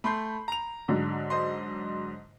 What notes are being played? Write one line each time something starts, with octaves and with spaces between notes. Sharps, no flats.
A3 B5 C6 G6 C7
A#5 F7
G#2 D3 F#3
C5 D#5 C6